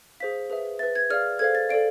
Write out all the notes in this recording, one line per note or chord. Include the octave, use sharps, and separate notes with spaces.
G#4 C5 F5 B6
G#4 B4 E5
B4 E5 A6
G#6
G#4 D5 F5 F6
A4 C5 F5 G#6
A6
A4 D5 F5 D7